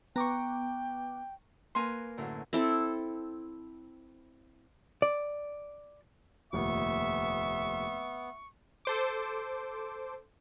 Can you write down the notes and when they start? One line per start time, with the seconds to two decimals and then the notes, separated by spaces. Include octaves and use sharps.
0.16 B3 G5 A#5 C#6 D6
1.75 A#3 A#4 B4 G#5 C6
2.17 F#2 A2 D3
2.53 C4 E4 A4
5.02 D5
6.53 F1 D#2 A#2 B3 E5 C#6
8.85 A4 C5 D6